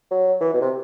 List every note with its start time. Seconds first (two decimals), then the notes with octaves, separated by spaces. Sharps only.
0.11 F#3
0.41 E3
0.54 B2
0.61 C3